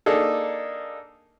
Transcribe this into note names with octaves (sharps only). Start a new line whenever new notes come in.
A#3 D4 D#4 G#4 A4